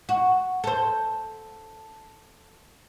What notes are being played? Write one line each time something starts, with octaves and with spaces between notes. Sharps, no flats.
F#4
A4 C5